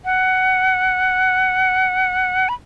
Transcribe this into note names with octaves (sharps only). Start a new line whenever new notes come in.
F#5
B5